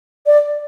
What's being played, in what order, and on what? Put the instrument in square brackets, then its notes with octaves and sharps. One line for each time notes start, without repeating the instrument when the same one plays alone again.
[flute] D5